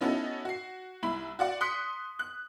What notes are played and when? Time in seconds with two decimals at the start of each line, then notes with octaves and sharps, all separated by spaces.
0.01 B3 C#4 D#4 E4 F#4 A4
0.45 F#4 C7
1.03 C2 E4 B5
1.39 F#4 D5 F#5
1.61 C6 D#6 F#6 B6 C#7
2.19 F#6